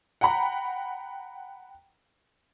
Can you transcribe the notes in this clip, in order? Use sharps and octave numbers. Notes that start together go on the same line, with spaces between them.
F#5 G5 A#5 B5